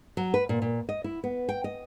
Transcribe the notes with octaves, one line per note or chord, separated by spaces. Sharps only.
F#3
B4
A#2
A#2
D#5
E4
B3
G5
D#5